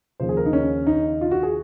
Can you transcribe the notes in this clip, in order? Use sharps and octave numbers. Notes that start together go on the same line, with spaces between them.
D#2 C#3 F3 C5
G#4
A#4
D#4
C#4
D#4
F4
F#4
G#4